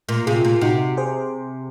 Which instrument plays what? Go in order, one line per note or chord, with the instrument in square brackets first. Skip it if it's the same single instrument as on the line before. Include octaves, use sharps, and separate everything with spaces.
[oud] A#2
[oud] C3 [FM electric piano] F4 G#4
[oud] A#2
[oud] C3 [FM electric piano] D#4 F#4
[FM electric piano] G#4 C5